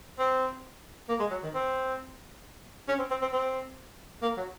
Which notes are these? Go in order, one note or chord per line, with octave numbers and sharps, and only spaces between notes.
C4
A#3
G#3
F#3
D#3
C4
C#4
C4
C4
C4
C4
A#3
F#3